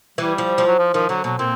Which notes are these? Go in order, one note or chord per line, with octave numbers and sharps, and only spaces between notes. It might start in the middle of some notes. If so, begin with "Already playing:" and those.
E3 G3
F3
F3
F#3
F3
D#3 F3
D3 F#3
B2 F#3
A#2 C4